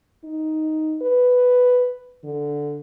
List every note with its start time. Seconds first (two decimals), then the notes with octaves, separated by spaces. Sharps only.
0.24 D#4
1.02 B4
2.24 D3